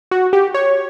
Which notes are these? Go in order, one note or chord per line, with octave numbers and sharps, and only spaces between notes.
F#4
G4
C#5